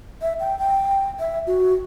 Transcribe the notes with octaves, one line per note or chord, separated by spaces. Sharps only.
E5
G5
G5
E5
F#4